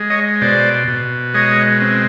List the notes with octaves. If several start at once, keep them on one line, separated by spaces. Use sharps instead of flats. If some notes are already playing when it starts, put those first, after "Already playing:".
Already playing: G#3
C#5 D#5
B2 C5 D5
B2
G#3 C#5 D#5
C4